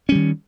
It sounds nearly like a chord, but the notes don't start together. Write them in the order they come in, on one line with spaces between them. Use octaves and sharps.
C#4 G3 D#3